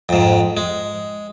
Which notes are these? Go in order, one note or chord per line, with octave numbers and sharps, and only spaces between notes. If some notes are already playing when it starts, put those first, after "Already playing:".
F2 G#2
G#3